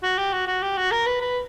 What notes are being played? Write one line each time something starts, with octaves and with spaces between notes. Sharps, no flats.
F#4
G4
F#4
F#4
G4
F#4
A#4
B4
B4